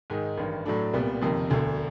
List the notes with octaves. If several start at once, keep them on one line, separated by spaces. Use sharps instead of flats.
G#2 D#3 G#3
A1 G2 D#3
A2 F#3 A3 D4
C2 A#2 G3 B3
F#1 F2 C3 D#3
E1 D2 D3